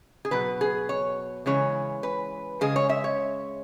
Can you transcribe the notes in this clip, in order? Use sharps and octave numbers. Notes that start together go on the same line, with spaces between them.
G#4
B2 F#3 B4
G#4
C#5
C#3 E3 G#3 C#5
B4
C#3 G#3 G#4
C#5
E5
C#5